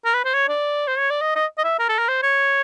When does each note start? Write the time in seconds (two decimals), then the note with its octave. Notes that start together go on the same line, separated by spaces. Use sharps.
0.05 A#4
0.14 B4
0.25 C5
0.34 C#5
0.48 D5
0.88 C5
0.98 C#5
1.10 D5
1.21 D#5
1.36 D#5
1.58 D#5
1.64 E5
1.79 A#4
1.89 A4
1.99 A#4
2.08 C5
2.22 C#5